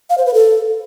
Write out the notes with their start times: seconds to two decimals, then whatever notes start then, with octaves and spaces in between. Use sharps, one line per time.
0.10 F5
0.18 C5
0.26 B4
0.34 A4